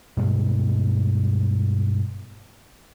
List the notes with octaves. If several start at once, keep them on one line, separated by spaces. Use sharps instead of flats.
G2 B2 G#3